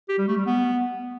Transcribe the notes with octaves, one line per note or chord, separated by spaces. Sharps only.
G4
G3
A3
G3
B3